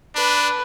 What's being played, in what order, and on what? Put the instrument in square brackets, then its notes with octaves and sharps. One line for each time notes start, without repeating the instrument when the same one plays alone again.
[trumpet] D4 [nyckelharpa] B4